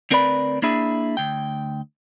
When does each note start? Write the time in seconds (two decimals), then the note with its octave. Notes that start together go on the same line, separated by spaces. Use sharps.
0.11 D2 C4 A#4 B4 D5 B5
0.62 A#3 D4 E4 G#4
1.17 D2 G5